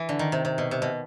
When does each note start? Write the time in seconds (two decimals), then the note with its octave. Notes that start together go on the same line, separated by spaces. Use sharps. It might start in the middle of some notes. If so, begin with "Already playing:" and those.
Already playing: E3
0.09 D3
0.19 D#3
0.32 C3
0.45 C3
0.58 B2
0.71 C3
0.82 B2